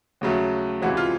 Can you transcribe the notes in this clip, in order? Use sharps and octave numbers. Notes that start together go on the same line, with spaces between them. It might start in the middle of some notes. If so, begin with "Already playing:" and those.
D#2 C#3 F#3 A3
C#2 C3 E3 G#3 F#4
F4